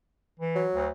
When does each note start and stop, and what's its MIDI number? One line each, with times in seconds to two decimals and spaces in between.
0.40 0.65 52
0.55 0.89 54
0.74 0.89 38